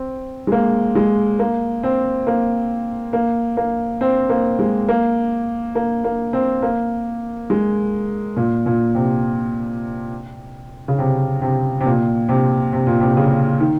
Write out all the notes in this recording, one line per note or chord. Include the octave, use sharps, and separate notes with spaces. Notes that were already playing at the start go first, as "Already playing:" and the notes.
Already playing: C4
G#3
A#3
G#3
A#3
C4
A#3
A#3
A#3
C4
A#3
G#3
A#3
A#3
A#3
C4
A#3
G#3
A#2
A#2
C3
C#3
C3
C3
C3
A#2
C3
C3
A#2
C3
C#3
D#3